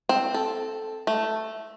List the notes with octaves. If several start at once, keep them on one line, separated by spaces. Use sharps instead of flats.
C4
A4
A3